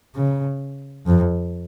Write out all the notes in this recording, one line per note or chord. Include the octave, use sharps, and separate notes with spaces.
C#3
F2